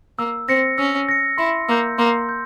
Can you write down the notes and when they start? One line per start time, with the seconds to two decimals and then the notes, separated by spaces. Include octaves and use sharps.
0.19 A#3 E6
0.49 C4 A#6 C#7
0.78 C#4 E6
1.09 A#6 C#7
1.38 E4 C6
1.68 A#3 E6 G6
1.98 A#3 C6
2.29 G6